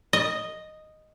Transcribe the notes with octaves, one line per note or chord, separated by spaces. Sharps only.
D#5